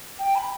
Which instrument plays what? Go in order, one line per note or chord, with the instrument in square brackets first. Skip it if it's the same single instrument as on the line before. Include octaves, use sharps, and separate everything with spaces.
[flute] G5
B5